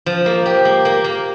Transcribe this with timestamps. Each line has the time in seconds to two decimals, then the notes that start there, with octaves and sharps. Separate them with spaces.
0.06 F3
0.26 A#3
0.46 G4
0.65 A#3
0.85 A#3
1.04 A#3